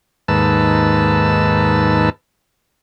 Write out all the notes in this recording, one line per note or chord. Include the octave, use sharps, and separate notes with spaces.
D#2 G#2 B4 A5 E6